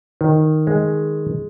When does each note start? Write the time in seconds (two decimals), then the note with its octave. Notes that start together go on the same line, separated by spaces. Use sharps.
0.21 D#3
0.67 G#3